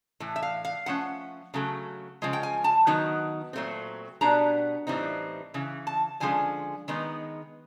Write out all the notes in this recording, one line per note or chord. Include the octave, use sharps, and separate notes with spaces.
A2 E3
E5
F5
F5
F3 A3 C#4 F#5
C#3 F#3 A3
C#3 F3 G#3
G5
G#5
A5
D#3 F#3 B3 D#4
A#2 F#3 A3 C4
B2 G3 B3 D4 A#5
A2 E3 G3 C4 D#4
C#3 E3
A5
D3 F3 G#3 C#4 G#5
D#3 G#3 B3 D#4